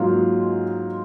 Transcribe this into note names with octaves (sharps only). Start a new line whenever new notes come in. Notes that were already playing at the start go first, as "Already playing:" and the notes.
Already playing: G#2 F#3 A#3 F4